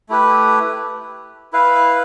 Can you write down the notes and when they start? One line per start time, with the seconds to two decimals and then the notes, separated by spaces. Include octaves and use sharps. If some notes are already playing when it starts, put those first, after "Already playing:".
0.09 A3 E4 G4 B4
1.53 E4 B4 F5